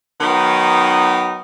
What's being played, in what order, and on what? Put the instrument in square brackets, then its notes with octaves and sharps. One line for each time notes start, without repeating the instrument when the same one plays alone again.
[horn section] D#3 F#3 B3 D#4